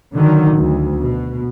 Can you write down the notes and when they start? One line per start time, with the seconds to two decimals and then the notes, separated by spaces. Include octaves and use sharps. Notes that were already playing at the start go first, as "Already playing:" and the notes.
0.14 D3 D#3 F#3
0.56 D2
1.01 B2